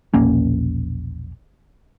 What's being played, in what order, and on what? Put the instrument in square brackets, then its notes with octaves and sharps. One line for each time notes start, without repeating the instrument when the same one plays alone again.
[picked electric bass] E1 A#1 A#3 C#4